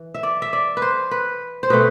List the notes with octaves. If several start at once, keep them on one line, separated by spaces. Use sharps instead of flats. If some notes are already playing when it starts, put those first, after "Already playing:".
Already playing: E3
E5
D5
E5
D5
B4
C5
B4
C5
B2 A3 C4 B4